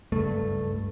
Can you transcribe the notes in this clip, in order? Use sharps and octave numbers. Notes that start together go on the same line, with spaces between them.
F#1 C#2 G2 A3